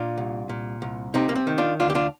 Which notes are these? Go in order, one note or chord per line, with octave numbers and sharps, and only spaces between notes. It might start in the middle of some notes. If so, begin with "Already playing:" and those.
Already playing: A#2 D4 F4
C2
A#2
C2
C3 C4 D#4
A#3
C4
D#3
D4 F4
D2 D4 F4
G4
D4 F4